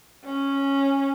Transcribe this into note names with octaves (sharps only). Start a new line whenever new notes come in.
C#4